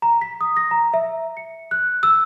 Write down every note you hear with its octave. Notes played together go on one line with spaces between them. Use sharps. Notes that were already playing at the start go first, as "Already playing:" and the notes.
A#5
B6
D#6
A#6
A#5
E5
C#7
F#6
E6